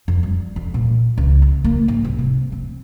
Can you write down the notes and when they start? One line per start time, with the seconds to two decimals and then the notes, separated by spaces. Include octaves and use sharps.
0.08 F2
0.23 G3
0.56 F2
0.74 A#2
1.18 C#2
1.42 C#3
1.64 A#3
1.88 G#2
2.04 C2
2.19 C3
2.52 C4